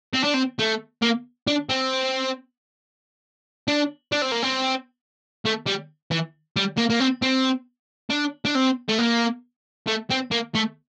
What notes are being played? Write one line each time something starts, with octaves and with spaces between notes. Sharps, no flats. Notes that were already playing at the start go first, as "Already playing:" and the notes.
C4
D4
C4
A3
A#3
D4
C4
D4
D4
C4
A#3
C4
A3
G3
E3
G3
A#3
A#3
C4
C4
D4
D4
C4
A3
A#3
A3
C4
A#3
A3